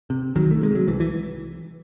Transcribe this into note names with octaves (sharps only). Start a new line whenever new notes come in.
C3
C2 D#3 F#3
A3
C3 G#3
F#3
C2 E3
E3